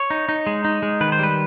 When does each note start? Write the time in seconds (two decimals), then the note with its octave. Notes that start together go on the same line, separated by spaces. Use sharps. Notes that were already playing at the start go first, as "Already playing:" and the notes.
Already playing: C#5
0.10 D#4
0.29 D#4
0.47 G#3
0.65 D#4
0.83 G#3
1.01 D#3 B4
1.12 C5
1.19 G3 B4